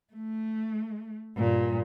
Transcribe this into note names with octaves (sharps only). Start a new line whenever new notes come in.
A3
G2 A#2